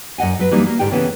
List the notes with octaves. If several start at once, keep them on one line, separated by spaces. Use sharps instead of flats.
F#2 D#5 F#5 G#5
F#3 B4
E3 F#3 G3 A#3 C4 D#4
A#3
G#2 D3 G4 G5
C#3 E3 A3 B3 C#4